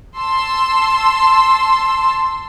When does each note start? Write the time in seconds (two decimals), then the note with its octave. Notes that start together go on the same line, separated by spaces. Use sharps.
0.18 A5 C6 E6